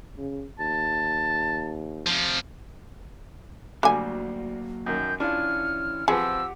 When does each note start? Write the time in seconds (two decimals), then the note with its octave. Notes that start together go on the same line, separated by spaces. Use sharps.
0.18 C#3
0.59 D#2 A5
2.06 C3 F3
3.83 D2 D3 F#3 G3 A#3 G#5
4.86 F#2 D#3 G6
5.20 E3 C#4 D4 F4 F6
6.08 F3 C4 G4 G#4 B4 F#5 E6